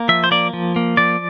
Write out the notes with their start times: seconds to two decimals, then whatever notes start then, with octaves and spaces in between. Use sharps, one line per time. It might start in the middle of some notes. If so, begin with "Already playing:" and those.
Already playing: A#3
0.08 F3 E5
0.24 C5
0.31 A#3 D5
0.53 F3
0.76 A#3
0.97 F3 D5